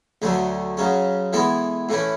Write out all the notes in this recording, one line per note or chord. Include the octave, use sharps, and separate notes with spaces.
D2 D3 F#3 A3 D4
F#2 C#3 F#3 C#4
E3 G#3 B3 E4 A4
A2 E3 A3 C#4 E4